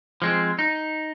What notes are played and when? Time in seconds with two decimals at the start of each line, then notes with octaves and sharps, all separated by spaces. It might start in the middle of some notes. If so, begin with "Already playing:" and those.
0.22 F3 G#3 C4
0.59 D#4